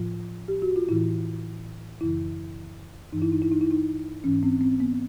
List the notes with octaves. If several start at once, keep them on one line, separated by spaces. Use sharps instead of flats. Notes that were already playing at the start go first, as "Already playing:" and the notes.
Already playing: A2 F3 F4
G4
F#4
F4
A2 E3 E4
F#2 C#3 E3 E4
G2 E3 D#4
E4
D#4
E4
D#4
E4
D#4
G#2 E3 C#4
C4
C4
B3